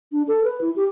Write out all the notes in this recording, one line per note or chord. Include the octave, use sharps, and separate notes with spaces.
D4
A4
B4
E4
G4